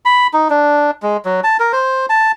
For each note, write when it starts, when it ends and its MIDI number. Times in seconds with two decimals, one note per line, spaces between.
0.05 0.27 83
0.33 0.48 63
0.50 0.91 62
1.03 1.17 56
1.25 1.41 54
1.44 1.57 81
1.60 1.72 70
1.73 2.06 72
2.09 2.32 81